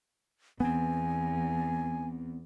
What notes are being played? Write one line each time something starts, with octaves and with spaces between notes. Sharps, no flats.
E2 B3 C4 G#5